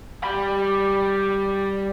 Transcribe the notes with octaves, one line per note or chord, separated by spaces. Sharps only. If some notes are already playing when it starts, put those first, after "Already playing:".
G3 B5